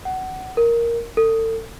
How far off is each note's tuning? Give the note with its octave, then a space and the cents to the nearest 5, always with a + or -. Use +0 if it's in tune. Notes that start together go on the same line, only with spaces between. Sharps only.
F#5 +20
A#4 +0
A4 +35